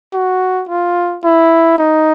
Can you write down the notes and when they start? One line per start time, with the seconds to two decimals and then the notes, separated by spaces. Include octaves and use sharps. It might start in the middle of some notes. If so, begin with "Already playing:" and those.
0.13 F#4
0.69 F4
1.24 E4
1.78 D#4